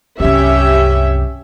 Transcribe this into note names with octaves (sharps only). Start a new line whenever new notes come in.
C2 F#2 C#4 G4 E5